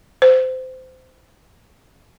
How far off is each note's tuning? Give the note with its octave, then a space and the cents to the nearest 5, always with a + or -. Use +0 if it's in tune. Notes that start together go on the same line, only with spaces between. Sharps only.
C5 -20